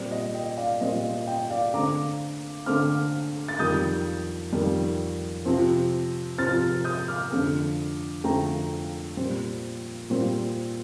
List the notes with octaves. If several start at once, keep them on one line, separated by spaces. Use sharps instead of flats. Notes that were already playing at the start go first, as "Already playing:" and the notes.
Already playing: A#2 G3 C4 D5
D#5
D#5 G5
D5 F5
A#2 G3 C4 D#5
D#5
D#5 G5
D5 F5
D3 A3 C4 A#5 D6
D3 A3 C4 D6 F6
A6
F2 D#3 G3 D#6 G6
F2 D#3 G3
C3 F3 C4
C3 F3 C4 F6 A6
D#6 G6
D6 F6
F2 D3 A3 C4
F2 D3 A3 C4 G5 A#5
A#2 G3 C4
A#2 G3 C4